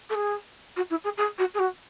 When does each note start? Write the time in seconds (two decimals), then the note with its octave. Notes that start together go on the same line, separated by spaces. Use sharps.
0.09 A4
0.14 G#4
0.76 F#4
0.90 E4
1.04 G#4
1.17 G#4
1.38 F#4
1.54 G#4
1.59 F#4